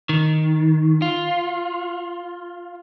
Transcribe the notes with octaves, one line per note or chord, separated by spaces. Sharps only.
D#3
F4